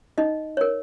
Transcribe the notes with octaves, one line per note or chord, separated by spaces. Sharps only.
D#4 D#5
A#4 C#5